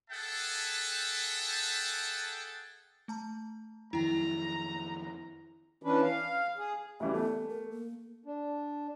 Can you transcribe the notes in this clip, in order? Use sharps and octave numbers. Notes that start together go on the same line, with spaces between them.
G#4 A4 E5 F#5 G5 A5
A3 A5 A#5
F2 D#3 F#3 E4 G5 A#5
E3 C#4 D4 B4
F5
G#4
D2 E3 G3 C#4
A3 B3
A#4
A#3
D4